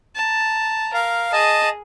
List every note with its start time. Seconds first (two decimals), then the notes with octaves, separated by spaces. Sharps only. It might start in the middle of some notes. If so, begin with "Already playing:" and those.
0.15 A5 A#5
0.94 A#4 F5
1.33 G#4 D#5 A5